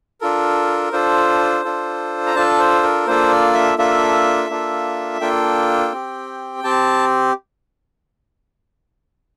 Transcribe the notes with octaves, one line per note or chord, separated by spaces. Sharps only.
D4 F4 A4 A#4
D4 F4 A4 C5
D4 F4 A4
A#5
D4 F4 A4 A5
C5
A#4
A#3 D4 F4 A4 C5
D5
E5
A#3 D4 F4 A4 E5
A#3 D4 F4 A4
A#3 D4 F4 A4 G5
C4 G4
C4 G4 A5